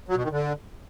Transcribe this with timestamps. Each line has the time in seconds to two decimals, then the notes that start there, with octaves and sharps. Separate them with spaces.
0.08 F#3
0.16 B2
0.24 D#3
0.31 D3